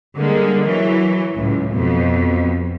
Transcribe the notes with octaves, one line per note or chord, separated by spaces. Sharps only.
D3 G3 G#3 A#3
E3 F#3
C#2 A2
F2 B2